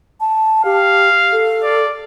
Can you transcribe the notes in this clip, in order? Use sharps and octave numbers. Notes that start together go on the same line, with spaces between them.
A5
G4 F5
A4
D5